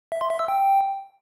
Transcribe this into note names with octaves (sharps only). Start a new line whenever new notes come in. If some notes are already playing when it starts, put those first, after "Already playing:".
E5
C6
E5
E6
G5